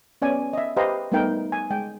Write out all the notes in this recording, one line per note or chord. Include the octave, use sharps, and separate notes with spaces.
B3 C#4 D5 G#5
D#5 E5
G4 B4 C5 D#5 F5 A#5
G3 A3 B3 D#4 A#4 G5
G#5
G#3 G5